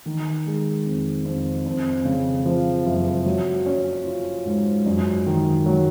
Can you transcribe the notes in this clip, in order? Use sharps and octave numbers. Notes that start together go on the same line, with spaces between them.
D#3
G#3
F2
F2
F2
C#3
F3
F#1
F#3
C#4
F4
G#2
F#2
D#3
F#3